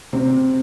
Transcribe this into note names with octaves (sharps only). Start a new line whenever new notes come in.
C3 C4